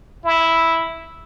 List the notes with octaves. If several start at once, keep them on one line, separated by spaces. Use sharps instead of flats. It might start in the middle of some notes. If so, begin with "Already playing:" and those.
E4